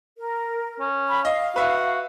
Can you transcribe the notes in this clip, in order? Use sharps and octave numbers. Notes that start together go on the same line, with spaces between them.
A#4
C#4
B5
D#5 F5
F#4 B4 E5